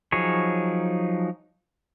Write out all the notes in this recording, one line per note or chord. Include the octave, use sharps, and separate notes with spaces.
F3 F#3 D#4 G#4 C#5